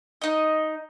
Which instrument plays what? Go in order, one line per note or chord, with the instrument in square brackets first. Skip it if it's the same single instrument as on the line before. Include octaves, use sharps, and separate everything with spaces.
[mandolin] D#4 D#5